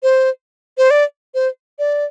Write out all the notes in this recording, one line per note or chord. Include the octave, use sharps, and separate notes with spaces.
C5
C5
D5
C5
D5